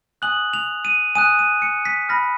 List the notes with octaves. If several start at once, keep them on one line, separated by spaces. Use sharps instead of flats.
G#5 D#6 F#6 F#7
F7
D#7
G#5 D#6 F#6 D#7
D#7
C#7
B6
B5 F6 A#6